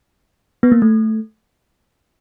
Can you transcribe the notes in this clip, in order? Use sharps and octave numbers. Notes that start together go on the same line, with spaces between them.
B3
A#3
A3